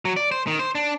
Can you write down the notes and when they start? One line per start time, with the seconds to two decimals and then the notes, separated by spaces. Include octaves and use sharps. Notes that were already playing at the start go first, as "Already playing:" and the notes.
0.05 F#3
0.17 D5
0.31 C5
0.47 D#3
0.59 C5
0.75 D4